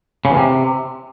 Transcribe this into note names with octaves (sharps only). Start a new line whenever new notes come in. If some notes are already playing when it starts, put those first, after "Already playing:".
C#3
E2
C3